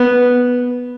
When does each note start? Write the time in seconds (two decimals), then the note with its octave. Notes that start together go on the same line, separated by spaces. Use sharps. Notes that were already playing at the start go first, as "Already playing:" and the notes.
Already playing: B3